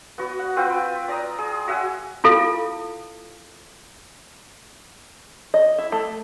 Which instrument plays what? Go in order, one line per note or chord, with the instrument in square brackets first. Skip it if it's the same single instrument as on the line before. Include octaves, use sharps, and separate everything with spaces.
[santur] B3 F#4
F#5
C4 F4 B4 G5
D5 A#5 D#6
G#4
F#4 E5 F#5 G#5
[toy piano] E4 F4 A4 F5
[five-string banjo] D#5
E4
A3